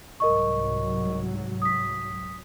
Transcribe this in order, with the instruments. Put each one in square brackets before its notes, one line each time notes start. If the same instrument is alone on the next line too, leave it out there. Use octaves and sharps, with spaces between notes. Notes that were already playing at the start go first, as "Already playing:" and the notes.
[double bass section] C2 G#2 F#3 [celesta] A#4 D#5 C#6
[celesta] D#6 B6